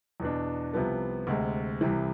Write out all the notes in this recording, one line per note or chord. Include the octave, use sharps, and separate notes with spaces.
E2 B2 B3 D4
C2 C3 F3 B3
D2 C3 G#3
C2 C3 E3